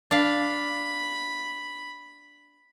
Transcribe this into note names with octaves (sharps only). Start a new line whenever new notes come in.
D4 F5 B5